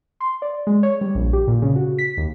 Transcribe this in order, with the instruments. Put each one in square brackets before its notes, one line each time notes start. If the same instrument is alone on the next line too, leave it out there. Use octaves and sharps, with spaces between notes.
[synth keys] C6
D5
G#3
C#5
G3
A#1
G4
A#2
C#3
F#4
B6
D#2